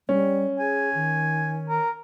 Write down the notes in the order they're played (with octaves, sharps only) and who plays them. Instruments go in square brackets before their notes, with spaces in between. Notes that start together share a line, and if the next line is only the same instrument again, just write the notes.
[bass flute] G3 [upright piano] C#4
[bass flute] G#4 [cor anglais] G#5
[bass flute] D#3
[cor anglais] A#4